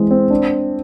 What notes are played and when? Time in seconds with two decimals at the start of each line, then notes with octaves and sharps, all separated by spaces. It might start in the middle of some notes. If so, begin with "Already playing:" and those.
Already playing: E3 G#3 C4
0.11 C4
0.30 D4